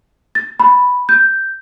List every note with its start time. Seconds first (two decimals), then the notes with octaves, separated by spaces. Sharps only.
0.35 A6
0.60 B5
1.09 G6